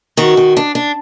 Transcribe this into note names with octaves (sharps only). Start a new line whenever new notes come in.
D#3 F#4
D#3
D4
D4